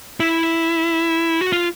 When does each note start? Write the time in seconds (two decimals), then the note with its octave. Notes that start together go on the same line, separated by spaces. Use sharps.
0.20 E4
1.41 F#4
1.53 F4